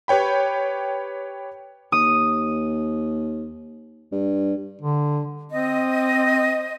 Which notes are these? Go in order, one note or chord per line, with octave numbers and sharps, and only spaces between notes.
G4 B4 C#5 G5 B5
D#2 D#6
G2
D3
C4 D#5